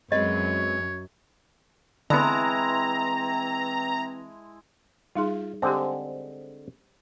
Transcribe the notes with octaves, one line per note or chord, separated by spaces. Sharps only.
F#2 F#3 G#3 C4 B4 C#5 D#5
D3 E3 G#3 B3 C4 E4 A5 A#5
G3 D#4 F4 G#4
D3 G#3 C4 G4 C5